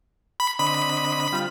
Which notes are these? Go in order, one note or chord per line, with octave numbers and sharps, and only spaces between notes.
B5
D3 C4 D#5 B5
G3 F4